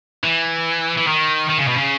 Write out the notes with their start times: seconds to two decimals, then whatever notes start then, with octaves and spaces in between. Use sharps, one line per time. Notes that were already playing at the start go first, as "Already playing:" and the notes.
0.23 E3
0.98 E3
1.07 D#3
1.49 D#3
1.59 C#3
1.68 B2
1.78 C#3